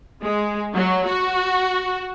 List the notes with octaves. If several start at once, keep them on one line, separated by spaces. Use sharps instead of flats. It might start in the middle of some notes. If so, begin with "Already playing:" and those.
G#3
F#3
F#4